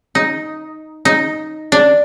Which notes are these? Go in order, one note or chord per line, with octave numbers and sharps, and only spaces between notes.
D#4
D#4
D4